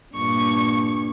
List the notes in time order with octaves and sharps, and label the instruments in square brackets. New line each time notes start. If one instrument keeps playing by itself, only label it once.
[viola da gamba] G2 A#2 [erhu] C#6